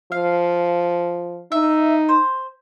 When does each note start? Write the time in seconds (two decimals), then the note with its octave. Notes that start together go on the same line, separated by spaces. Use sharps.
0.12 F3 F5
1.52 D#4 E5
2.09 C5